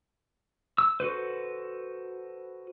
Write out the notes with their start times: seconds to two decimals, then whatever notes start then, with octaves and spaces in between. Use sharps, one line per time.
0.78 E6
1.00 F#4 A4 B4 C5